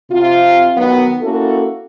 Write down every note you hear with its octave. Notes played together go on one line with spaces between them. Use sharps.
C3 F4
D#3 F#3 B3
A#3 C#4 E4 F#4 A4